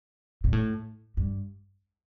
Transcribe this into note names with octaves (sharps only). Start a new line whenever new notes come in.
A#2
A2
G2